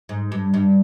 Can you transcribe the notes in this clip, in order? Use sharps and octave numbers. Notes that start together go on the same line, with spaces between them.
G#2
G2
G2